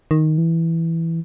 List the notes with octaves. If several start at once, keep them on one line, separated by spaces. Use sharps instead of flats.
D#3
E3